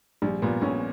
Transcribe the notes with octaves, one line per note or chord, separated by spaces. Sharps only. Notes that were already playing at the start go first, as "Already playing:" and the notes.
A#1 G3
A#2 B3
A#1 C#4